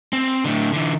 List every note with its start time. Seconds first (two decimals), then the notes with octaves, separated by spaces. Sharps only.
0.13 C4
0.44 A2 D3
0.73 D3 E3